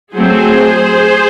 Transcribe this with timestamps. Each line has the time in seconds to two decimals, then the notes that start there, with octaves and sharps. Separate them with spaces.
0.15 F#3 A3 C4 G#4 C5